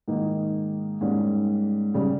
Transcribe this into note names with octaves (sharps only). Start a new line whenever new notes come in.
G#2 D#3 A#3 D#4
G#2 G3 A#3 C#4
C#3 G3